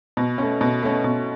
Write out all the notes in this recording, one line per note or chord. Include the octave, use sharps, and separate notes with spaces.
B2
A3 C#4
B2
A3 C#4
B2